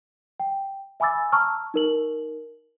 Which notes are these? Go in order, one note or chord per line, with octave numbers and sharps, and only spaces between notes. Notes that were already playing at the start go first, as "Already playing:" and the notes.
G5
E5 G#5 B5 D6 E6 A6
A5 A#5 C#6 E6 F6
D#4 A#4 F#7